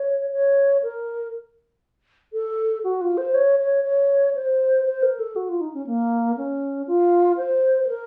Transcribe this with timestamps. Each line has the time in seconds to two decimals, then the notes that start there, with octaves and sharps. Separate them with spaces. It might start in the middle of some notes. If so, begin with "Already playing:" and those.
Already playing: C#5
0.32 C#5
0.83 A#4
2.33 A4
2.84 F#4
3.01 F4
3.18 C5
3.34 C#5
3.59 C#5
3.84 C#5
4.35 C5
4.85 C5
5.03 A#4
5.19 A4
5.36 F#4
5.49 F4
5.61 D#4
5.74 C#4
5.87 A#3
6.37 C#4
6.87 F4
7.37 C5
7.83 C5
7.88 A#4